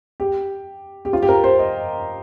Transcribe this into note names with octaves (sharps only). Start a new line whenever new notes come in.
G4
G4
F4
G4
A#4
C5
D#5